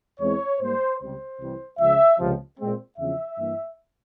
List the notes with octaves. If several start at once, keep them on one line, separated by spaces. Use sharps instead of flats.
E2 E3 G#3 C4 C#5
G#2 G3 A#3 C5
C#2 C3 G3 C5
C2 C3 E3 G3
C#2 C#3 F3 E5
C#2 C3 F3
A#2 G#3 C4
E2 C#3 F3 C4 E5
G2 E3 A#3